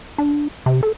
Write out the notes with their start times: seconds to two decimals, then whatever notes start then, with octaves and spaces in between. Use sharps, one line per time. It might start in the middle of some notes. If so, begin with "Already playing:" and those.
0.18 D4
0.66 C3
0.83 A4